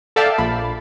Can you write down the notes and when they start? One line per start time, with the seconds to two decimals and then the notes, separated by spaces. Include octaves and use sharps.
0.16 A4 D5 E5 F5 G5 A5
0.38 A#1 B5